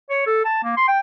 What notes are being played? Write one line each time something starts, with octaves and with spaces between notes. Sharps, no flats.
C#5
A4
A5
A#3
C6
G5